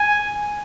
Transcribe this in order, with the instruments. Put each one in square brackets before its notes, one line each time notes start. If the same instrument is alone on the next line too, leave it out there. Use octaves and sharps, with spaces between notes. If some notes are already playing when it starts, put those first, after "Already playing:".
Already playing: [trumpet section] G#5